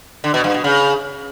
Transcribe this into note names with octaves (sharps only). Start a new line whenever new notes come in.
D3
B2
G2
B2
C#3